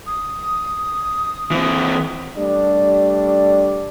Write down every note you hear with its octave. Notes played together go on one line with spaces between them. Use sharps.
D#6
E3 C4
G3 A3 D4